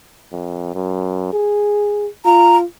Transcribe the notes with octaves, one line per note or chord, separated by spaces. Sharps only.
F2
F#2
G#4
F4 A#5